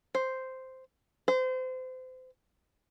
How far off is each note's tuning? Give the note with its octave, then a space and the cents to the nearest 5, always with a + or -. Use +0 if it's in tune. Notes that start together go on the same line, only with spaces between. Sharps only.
C5 -5
C5 -30